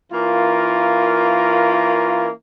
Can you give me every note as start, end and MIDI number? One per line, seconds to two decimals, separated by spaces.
0.12 2.29 52
0.12 2.29 58
0.12 2.29 61
0.12 2.29 65
0.12 2.29 70